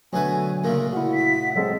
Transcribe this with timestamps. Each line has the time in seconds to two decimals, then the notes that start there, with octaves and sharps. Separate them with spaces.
0.13 B2 D3 F#3 A3 B4 G#5
0.64 A#2 C#3 A3 A#4
0.93 E4 F#4 F#5
1.14 B6
1.55 F#3 G#3 C4 A4